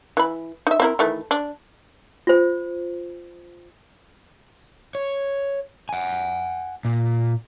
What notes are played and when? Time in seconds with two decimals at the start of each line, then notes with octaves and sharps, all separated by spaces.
0.17 E3 B5
0.67 D#4 E5
0.80 C4 E4 A#4
0.99 D#3 E3 A3
1.31 D4
2.27 F4 C5
4.95 C#5
5.89 F#5 G#5
6.85 A#2